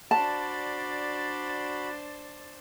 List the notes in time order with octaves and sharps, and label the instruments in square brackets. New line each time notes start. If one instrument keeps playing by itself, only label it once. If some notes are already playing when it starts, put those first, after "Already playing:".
[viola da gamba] D4 C5 D5 [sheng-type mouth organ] F#4 B5 [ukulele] A5